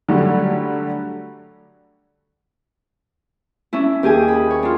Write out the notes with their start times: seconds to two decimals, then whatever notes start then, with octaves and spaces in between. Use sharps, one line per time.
0.08 D3 F#3 G3 A3
3.73 C#4 D4 E4
4.03 D#2 G4 G#4 G#5 D#6
4.28 B5
4.50 C#5
4.63 D4 F4